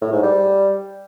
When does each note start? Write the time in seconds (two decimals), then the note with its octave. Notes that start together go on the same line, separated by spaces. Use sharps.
0.01 A2
0.12 G#2
0.23 G3